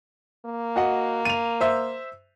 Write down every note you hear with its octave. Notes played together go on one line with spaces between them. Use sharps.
A#3
F#4 D#5 F#5
D#7 F7
C5 E5 E6